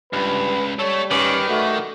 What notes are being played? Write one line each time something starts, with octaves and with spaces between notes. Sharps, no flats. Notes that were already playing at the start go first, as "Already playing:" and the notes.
C#2 G2 B4
G3 A3 A4 C#5
D#3 C#4 B4 D5
A3 F#4